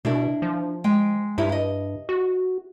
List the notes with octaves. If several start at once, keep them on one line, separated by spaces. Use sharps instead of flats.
B2 D4 E4 A#4
F3
G#3 G5
G2 G3 D#4 E4
D#5
F#4